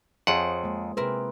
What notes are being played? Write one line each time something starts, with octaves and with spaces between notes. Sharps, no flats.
F2 F4 G#4 C5 C#5 F#5
G#3 A#3
C3 C4 E4 G#4 A#4 B4